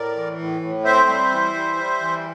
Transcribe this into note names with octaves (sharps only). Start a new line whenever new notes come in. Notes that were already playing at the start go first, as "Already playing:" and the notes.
Already playing: A2 A#4 D5
E3
A2
A2
C4 C5 E5
G3
E3
G3
G3
E3